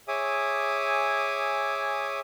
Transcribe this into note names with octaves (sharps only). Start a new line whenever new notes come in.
G#4 C#5 E5 G#5 D6 D#6